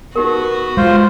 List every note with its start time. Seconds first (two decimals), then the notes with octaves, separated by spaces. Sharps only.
0.16 B3 D#4 F#4 G4 A#4
0.77 G#3 F4 C5